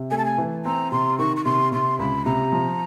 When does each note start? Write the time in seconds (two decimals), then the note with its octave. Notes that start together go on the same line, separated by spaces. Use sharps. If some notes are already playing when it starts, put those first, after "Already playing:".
Already playing: C3
0.11 A3 G#5
0.18 A5
0.25 G#5
0.38 E3
0.65 C4 A#5
0.92 C3 C6
1.19 D#3 C#6
1.37 C#6
1.45 C3 C6
1.72 C3 C6
1.99 C#2 B5
2.25 C3 A#5
2.52 F3